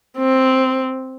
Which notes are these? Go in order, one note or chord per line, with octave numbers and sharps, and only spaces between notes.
C4